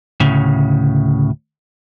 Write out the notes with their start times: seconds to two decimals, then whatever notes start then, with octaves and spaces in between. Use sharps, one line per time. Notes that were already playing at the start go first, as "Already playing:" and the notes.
0.20 D2 A2 C#3